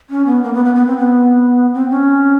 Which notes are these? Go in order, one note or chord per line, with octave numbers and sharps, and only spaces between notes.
C#4
B3
A#3
B3
B3
B3
C4
B3
C4
C#4